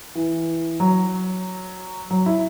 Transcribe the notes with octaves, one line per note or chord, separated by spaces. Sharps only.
E3
F#3
F#3
E4